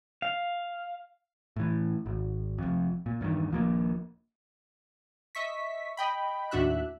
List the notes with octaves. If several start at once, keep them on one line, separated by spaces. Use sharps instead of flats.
F5
A2 E3
G#1
F1 F2
A#2
E2 G2 C3 D#3
D#1 F3 F#3 A#3
D#5 E5 C#6 B6
D#5 G5 B5
D#2 A2 D4 F#4 E5 F#6